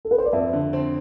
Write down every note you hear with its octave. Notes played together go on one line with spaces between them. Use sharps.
A4
B4
C5
D5
F2 E5
D3
C4